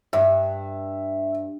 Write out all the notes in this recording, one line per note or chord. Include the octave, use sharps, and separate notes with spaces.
G2 E5